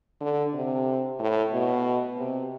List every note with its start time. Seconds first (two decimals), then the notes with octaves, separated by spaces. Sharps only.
0.21 D3
0.54 C3
1.20 A2
1.52 B2
2.18 C3